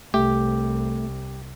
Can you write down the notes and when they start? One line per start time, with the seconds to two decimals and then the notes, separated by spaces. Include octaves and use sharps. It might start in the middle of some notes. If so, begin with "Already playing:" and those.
0.14 C2 C3 A3 G4